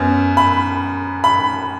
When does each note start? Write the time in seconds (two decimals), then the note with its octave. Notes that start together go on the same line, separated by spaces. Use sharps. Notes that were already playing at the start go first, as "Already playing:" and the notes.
Already playing: F#2 B3
0.37 B5
1.24 B5